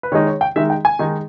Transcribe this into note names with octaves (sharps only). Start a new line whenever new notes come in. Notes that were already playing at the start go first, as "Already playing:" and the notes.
B4
D#3 G#3 D#4 C#5
C#5
G5
D#3 G#3 D#4 E5
G5
G#5
D#3 G#3 D#4